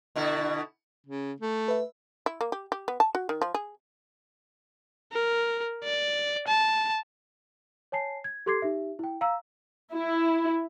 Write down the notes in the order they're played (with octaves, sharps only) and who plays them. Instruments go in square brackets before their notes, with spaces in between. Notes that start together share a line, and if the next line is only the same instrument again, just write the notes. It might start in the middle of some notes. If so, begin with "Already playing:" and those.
[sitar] B2 D3 E4
[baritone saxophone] C#3
A3
[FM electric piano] B4 E5
[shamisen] E4
A#3
G4
G4
B3
A5
F#4
D#3
F3
G#4
[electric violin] A#4
D5
A5
[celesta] C#5 G#5 A5 C7
G#6
G4 A4 C6 D6 G#6 C7
D#4 G4 E5
E4 G5
F5 A#5 E6
[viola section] E4